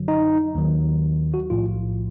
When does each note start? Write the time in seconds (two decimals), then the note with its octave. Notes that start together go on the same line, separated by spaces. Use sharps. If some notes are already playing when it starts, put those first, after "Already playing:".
Already playing: G#1 F#2 D3 F#3
0.08 D#4
0.55 D#2 D#3 F#3
1.34 F#4
1.50 B1 A2 F3 F4